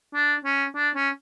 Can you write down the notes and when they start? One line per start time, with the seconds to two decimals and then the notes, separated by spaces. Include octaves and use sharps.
0.14 D4
0.45 C#4
0.75 D4
0.95 C#4